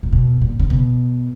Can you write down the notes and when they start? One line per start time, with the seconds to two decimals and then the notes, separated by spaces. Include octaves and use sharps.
0.03 A#2
0.13 B2
0.41 A#2
0.60 C#3
0.70 B2